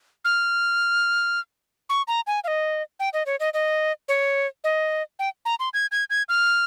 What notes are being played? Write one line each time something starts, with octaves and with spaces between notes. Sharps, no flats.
F6
C#6
A#5
G#5
F5
D#5
G5
D#5
C#5
D#5
D#5
C#5
D#5
G5
A#5
C6
G#6
G#6
G#6
F6